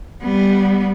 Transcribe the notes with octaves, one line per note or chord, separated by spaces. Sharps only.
G3 B3